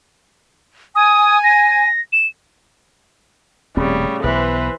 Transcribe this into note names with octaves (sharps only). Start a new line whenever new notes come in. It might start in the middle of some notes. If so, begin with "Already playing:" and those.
G#5 D#6
A#6
E7
D#1 A2 C#3 G3 C4
B1 E3 B3 B4 C5